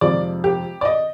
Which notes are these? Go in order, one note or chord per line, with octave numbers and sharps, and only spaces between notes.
F2 C3 F3 G#3 D#4 D5
G4
D5
D#5